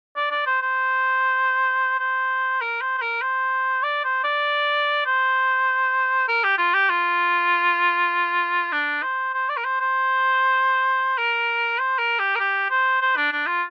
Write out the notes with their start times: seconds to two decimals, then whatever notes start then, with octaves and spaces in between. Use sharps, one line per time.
0.17 D5
0.31 D5
0.46 C5
0.62 C5
1.99 C5
2.62 A#4
2.81 C5
2.98 C5
3.02 A#4
3.22 C5
3.83 D5
4.04 C5
4.24 D5
5.06 C5
6.28 A#4
6.44 G4
6.58 F4
6.74 G4
6.90 F4
8.72 D4
9.03 C5
9.34 C5
9.50 D5
9.57 A#4
9.65 C5
9.80 C5
11.18 A#4
11.79 C5
11.99 A#4
12.19 G4
12.35 A#4
12.40 G4
12.70 C5
13.01 C5
13.17 D4
13.32 D4
13.47 F4